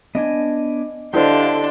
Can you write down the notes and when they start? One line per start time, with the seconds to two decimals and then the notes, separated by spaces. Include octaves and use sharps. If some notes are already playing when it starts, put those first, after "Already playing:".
0.15 B3 D4 D#5 G#5
1.14 D3 D4 E4 G4 C5 D#5 F5 C6